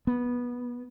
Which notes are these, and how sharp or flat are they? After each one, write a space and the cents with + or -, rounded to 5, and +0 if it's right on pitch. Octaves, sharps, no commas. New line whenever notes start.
B3 -15